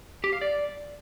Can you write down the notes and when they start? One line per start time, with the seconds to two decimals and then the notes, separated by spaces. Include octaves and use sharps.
0.24 G4
0.33 F5
0.41 D5